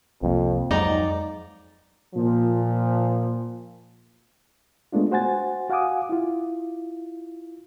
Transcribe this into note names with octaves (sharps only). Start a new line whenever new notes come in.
C2 F2 A#3
F2 G#2 F#3 D#4 D5 A#5
A#2 F3
G#3 A3 B3 D4 F4
F#4 C5 F#5 G#5 A6
F#4 F5 F#5 G#5 D6 D#6
E4 F4